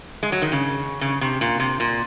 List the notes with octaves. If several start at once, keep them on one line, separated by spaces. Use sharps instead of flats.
G#3
F#3
D#3
C#3
C#3
C3
A#2
C3
A#2